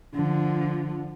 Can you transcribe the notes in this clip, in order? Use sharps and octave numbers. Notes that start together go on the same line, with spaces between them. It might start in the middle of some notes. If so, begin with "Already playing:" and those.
D3 F3